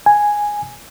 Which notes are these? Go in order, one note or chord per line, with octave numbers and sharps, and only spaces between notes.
G#5